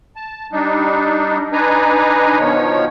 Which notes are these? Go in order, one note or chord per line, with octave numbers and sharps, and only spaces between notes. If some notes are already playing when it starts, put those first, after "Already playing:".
A5
G3 D4 D#4
D4 D#4 B4 G#5 A#5
B2 D#3 F3 C#5